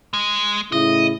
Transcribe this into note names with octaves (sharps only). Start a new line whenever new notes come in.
G#3
A2 C#3 E4 D#5